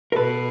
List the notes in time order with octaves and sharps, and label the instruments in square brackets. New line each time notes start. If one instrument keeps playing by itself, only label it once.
[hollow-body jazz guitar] A#4
[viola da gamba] B2 [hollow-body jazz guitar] A4 B4